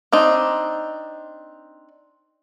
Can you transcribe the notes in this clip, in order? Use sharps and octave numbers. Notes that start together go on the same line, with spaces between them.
C4 D4 D#4